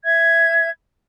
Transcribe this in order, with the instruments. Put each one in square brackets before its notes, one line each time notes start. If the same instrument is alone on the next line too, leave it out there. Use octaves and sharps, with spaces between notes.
[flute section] E5 G#6